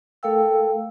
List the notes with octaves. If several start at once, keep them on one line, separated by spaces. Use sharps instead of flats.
A3 A4 A#4 F5 G5 E6